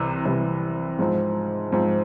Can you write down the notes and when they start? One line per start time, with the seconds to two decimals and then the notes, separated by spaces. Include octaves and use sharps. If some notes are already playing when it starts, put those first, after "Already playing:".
Already playing: C2 C3 E3
0.25 C2 C3 E3
0.99 G#2 F3 C4
1.72 G#2 F3 C4